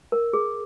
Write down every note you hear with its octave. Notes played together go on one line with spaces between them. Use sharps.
A#4
G#4